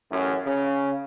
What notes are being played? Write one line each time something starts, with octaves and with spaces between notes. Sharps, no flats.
A1 F#2
C#3